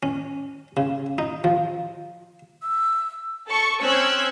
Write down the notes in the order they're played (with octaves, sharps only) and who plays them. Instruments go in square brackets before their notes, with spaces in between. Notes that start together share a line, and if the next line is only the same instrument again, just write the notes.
[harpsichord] C#4
C#3
D#4
F3
[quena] E6
[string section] A4 A5 C#6
C4 C#4 C5 E6 F#6 G#6